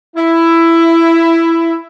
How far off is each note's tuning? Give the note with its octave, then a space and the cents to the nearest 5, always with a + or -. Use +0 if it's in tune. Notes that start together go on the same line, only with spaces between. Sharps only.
E4 +10